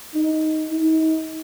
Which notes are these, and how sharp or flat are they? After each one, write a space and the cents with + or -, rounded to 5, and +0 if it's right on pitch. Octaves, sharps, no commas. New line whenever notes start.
D#4 +5
D#4 +40